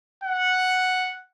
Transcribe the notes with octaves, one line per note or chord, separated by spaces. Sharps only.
F#5